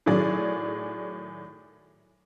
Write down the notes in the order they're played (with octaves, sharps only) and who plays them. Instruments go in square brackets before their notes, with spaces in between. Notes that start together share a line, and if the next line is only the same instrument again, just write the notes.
[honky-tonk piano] A2 D#3 F#3 G#4 D5